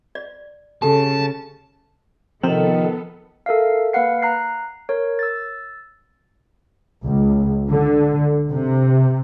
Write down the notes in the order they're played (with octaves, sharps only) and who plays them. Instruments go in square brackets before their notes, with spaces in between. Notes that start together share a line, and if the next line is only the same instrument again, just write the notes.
[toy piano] D5
[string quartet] C#3 [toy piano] G4 A4 [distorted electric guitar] A5
[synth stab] C3 [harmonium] D#3 [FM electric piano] F3 [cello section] B3 A4
[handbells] A4 A#4 E5 F5
A#3 B4 F5 F#5 C7
A#5 F#6 C7
A#4 C#5
E6 A6
[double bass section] C#2
D3
C3